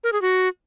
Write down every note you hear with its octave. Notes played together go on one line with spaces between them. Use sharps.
A#4
G#4
F#4